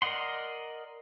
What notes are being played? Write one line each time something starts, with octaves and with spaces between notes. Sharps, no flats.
A#4 D5 D#5 F#5 C6